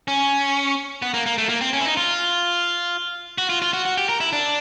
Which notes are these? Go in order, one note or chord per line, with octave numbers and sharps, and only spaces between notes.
C#4
B3
A#3
A#3
A3
A#3
C4
C#4
E4
D#4
F4
F#4
F4
F4
F#4
F#4
G4
A#4
E4
D4